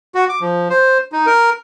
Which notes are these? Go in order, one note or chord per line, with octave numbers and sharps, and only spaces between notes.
F#4
D6
F3
C5
D#4
A#4